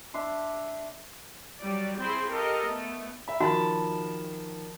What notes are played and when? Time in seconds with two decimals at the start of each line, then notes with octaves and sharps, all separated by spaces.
0.14 D4 E5 C6
1.62 F#3 G3 D5
2.00 C4 E4 G#4 C5 B5 C6
2.30 G4 A4 A#4 D#5 F5
2.63 A3 B3
3.28 E5 B5
3.40 D#3 F3 F#4 A5 B5